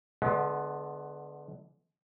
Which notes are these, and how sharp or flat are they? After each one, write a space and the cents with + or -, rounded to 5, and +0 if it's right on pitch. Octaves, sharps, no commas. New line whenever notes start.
D3 +0 G#3 +35 B3 +0